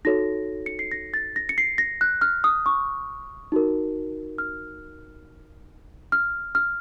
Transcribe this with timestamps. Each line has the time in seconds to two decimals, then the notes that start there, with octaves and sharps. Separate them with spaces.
0.05 D#4 F#4 A4 C#5 A#6
0.66 C#7
0.79 C7
0.91 A#6
1.14 A6
1.36 A#6
1.49 C#7
1.58 C7
1.78 A#6
2.01 F#6
2.21 F6
2.44 D#6
2.66 C#6
3.52 D#4 F#4 A#4
4.38 F6
6.12 F6
6.55 F6